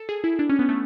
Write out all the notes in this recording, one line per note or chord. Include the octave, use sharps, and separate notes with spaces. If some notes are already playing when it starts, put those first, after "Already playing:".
Already playing: A4
G#4
E4
D4
C#4
B3
A3